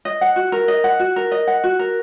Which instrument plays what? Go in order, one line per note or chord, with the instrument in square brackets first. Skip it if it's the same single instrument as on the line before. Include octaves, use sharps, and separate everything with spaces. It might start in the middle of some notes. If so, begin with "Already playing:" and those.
[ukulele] D#5
F#5
F#4
A#4
D#5
F#5
F#4
A#4
D#5
F#5
F#4
A#4